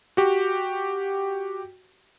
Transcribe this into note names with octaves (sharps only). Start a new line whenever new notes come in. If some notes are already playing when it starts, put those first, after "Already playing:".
F#4 G4